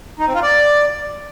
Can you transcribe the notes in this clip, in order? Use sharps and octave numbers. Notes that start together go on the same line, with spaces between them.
D#4
C4
F4
D5